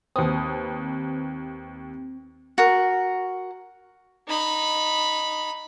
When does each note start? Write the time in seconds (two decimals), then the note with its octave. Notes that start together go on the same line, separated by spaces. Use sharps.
0.16 D#2 C4 B4 D#6
2.58 F#4 A#4
4.28 D#4 B5